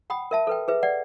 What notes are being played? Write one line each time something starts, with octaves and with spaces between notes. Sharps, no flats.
F#5 G5 B5 D#6
A#4 E5 A5
A4 B4 G5
G#4 B4 E5
D5 F#5